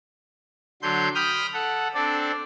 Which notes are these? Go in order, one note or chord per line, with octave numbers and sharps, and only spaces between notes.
D3 F#3 C6 G6
G5 B5 D#6 F6 G6
A4 F#5
C4 D4 A4 D5